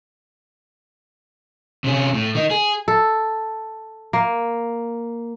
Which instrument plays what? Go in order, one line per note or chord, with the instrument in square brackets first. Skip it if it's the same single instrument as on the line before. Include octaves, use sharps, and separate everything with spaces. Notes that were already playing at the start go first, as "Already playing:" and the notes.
[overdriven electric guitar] C3 C#4
A2
D#3 D#4
G#4
[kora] A4
A#3